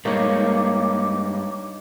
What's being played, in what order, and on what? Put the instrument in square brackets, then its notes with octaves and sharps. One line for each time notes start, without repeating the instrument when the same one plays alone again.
[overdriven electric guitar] G2 G#3 [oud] A#3 [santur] D#4 C#5 [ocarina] D6